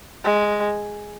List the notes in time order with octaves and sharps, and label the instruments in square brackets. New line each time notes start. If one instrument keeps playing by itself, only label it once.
[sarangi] G#3